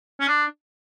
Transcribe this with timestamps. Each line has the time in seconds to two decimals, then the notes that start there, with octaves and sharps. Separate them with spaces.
0.20 C#4
0.28 D4